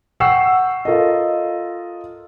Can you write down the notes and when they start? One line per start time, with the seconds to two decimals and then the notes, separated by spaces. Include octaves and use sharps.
0.20 F#5 G5 C#6 E6 C7
0.85 F4 A4 A#4 D#5